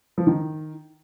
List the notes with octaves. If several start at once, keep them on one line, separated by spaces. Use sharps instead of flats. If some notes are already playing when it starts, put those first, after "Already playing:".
F3
D#3